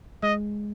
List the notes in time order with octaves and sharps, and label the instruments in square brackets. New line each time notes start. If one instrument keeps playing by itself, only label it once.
[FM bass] G#3 [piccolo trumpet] D#5